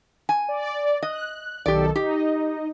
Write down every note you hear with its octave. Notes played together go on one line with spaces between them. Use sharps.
G#5
D5
D#5 F#6
B1 D#3 G4 A4 D5
D#4 G4 D#5